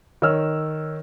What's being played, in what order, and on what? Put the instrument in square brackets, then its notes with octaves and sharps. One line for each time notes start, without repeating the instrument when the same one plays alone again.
[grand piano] D#3 C#5 E6 F6